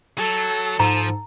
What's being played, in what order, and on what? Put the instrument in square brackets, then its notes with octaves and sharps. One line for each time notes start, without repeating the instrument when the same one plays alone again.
[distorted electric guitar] F#3 [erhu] A4
[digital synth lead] G#2 [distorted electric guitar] F3 [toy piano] A#5